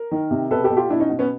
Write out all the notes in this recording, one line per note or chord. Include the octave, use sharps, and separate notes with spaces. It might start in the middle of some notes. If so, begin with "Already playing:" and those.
Already playing: A#4
D#3
C3
B2 A4 B4
G4 A4
B2
F4 G4
B2 D4 E4
C#4 D#4
B2
B3 C#4